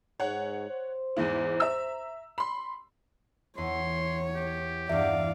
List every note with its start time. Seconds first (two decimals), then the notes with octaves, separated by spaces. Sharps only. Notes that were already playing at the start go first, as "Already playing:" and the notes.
0.20 G#2 C#5 F#5
0.69 C5
1.17 E2 G#2 E4
1.60 E5 A#5 E6
2.38 B5 C6
3.58 E2 C#5 C6
4.36 G4
4.89 E2 G2 D5 E5 F5